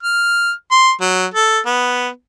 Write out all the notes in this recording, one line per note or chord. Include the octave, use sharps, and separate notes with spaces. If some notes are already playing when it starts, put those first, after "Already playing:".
F6
C6
F#3
A4
B3